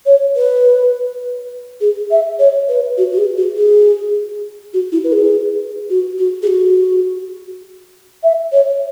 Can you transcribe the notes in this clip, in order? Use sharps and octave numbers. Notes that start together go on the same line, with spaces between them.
C#5
B4
G#4
E5
C#5
B4
F#4
F#4
G#4
F#4
G#4
F#4
E4
B4
G#4
F#4
F#4
G#4
F#4
E5
C#5